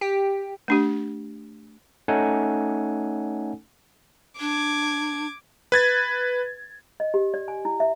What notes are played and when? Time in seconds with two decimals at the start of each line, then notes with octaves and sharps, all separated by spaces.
0.01 G4
0.68 A3 D4 G4
2.08 A3 C#4 D#4 A4 F#5 G#5
4.40 D4 D6 G#6
5.72 B4 G#6 A6
7.00 D#5
7.14 G4
7.34 D5
7.48 G#5
7.65 E4
7.80 E5